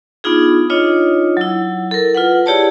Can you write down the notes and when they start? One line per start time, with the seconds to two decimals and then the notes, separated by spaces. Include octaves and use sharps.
0.24 B3 D4 D#4 F4 G#4
0.70 D4 D#4 F4 C#5 D#5
1.37 F#3 E4
1.91 A4 A#4
2.14 F4 B4 F#5
2.46 E4 G4 G#4 C#5 D5 A5